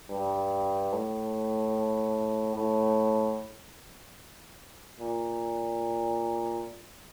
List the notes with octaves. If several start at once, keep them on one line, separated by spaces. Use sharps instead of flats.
G2
A2
A2
A#2